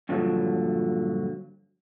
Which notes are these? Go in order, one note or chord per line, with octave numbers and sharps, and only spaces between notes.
G2 A#2 D3 F3 F#3